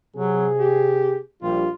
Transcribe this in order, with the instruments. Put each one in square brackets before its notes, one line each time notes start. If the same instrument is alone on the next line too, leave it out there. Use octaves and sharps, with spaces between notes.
[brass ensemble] C3 G#4 [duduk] F#3
[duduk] G4
[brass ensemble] A#1 G3 [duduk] F4